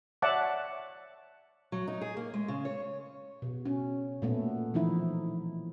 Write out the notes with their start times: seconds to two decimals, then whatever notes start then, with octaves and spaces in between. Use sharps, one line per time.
0.22 C#5 D5 E5 F#5 A5 D6
1.72 F#3
1.87 D#4
2.01 G#4
2.17 A#3
2.34 G#3
2.48 C#3
2.65 C#5
3.42 B2
3.65 C#4
4.22 A#2 A3 B3
4.74 E3 F3 D#4 E4